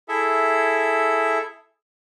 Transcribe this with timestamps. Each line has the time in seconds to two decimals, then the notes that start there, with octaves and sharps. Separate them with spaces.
0.08 E4 G#4 A4 E5